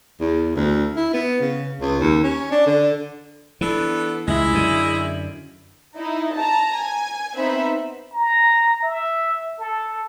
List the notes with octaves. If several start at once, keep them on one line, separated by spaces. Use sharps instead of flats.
E2
D2
E4
B3
C#3
C#2
D#2
C#4
D4
D3
E3 B3 D4 A4
C#2 G#3 C#4 E4
F#2 D3
D#4 E4
A5 A#5
G#5
B3 C4 D#4 C5 E5 B5
A#5
E5
A4